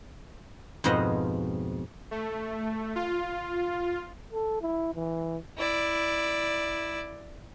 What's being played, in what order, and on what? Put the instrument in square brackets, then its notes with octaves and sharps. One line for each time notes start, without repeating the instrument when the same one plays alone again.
[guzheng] F2 G#2 B2 F3 D#5 F#5
[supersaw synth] A3
F4
[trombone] A4
E4
E3
[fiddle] E4 D5